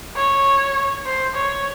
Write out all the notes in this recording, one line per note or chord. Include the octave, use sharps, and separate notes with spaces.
C#5
C5
C#5